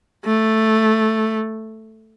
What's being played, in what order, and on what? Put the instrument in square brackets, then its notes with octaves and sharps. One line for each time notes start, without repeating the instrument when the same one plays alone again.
[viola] A3